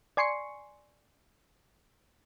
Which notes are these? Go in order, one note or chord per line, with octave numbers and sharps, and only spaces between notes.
D5 G#5 C6 C#6 C7 C#7